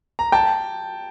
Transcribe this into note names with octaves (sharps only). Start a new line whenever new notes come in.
A#5
G5 A5